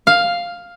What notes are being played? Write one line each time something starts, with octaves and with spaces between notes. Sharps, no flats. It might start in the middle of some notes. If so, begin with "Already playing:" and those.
F5